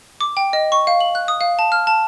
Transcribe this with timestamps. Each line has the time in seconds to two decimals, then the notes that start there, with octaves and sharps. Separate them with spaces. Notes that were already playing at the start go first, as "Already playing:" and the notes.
0.21 D6
0.37 G5
0.53 D#5
0.72 C#6
0.87 F5
1.01 F#7
1.15 F#6
1.28 D#6
1.41 F5
1.59 A5
1.72 F6
1.87 A5